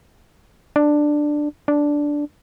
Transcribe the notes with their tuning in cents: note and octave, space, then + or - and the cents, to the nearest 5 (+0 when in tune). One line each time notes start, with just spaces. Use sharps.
D4 +10
D4 -5